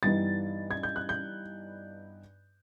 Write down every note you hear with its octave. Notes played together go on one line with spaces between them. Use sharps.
G2 E3 G3 B3 D#4 A6
G#6
G6
F#6
G6